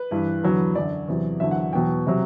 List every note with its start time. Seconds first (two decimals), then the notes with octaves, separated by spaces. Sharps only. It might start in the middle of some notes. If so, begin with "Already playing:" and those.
Already playing: B4
0.11 G2 E3
0.43 E2 D3 F#3
0.75 F#2 D3 F#3 D5
1.08 E2 C3 F#3
1.40 E2 D3 F#3 E5
1.51 F#5
1.73 E2 B2 F#3 G5
2.07 C3 F#3